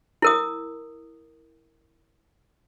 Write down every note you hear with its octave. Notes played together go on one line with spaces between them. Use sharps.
E4 A#4 D#6